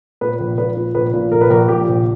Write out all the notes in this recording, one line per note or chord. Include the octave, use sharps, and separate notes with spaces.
A#2 B4
A#1
A#2 B4
A#2
A#1 B4
A#2
A#1 A#4
B4
A#1 A#4
A#2 G4
A#1